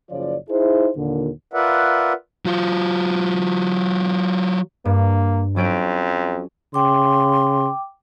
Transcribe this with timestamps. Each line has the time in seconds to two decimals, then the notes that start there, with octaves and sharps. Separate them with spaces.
0.10 F#1 C#3 F3 F4 C#5 D5
0.49 D#4 E4 G#4 C5
0.97 D#2 A#2 D3
1.53 F4 A#4 B4 D5 E5 F#5
2.45 F#3 F4
4.85 G2 A#3
5.56 F2 F#3 C#4 D7
6.74 C#3 G5 C6 D6